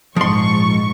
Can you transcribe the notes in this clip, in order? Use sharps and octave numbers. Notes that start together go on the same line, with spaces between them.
A#1 G#2 F3 C6 C#6